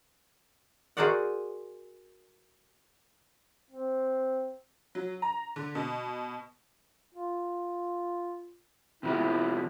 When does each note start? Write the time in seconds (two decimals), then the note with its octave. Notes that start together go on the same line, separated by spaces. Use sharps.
0.97 F#4 G#4 A#4 C5 D5 F#5
3.71 C4
4.95 F#3
5.22 A#5
5.56 D3
5.75 B2
7.14 F4
9.03 C3 F3 B3 E4